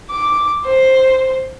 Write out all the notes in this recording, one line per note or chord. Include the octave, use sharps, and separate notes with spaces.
D6
C5